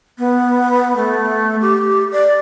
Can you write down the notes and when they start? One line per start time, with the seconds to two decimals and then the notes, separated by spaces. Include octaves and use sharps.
0.19 B3
0.96 A3
1.61 G4
2.12 D5